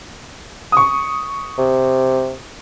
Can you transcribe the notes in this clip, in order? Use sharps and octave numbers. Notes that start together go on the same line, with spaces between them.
C#6 D#6
C3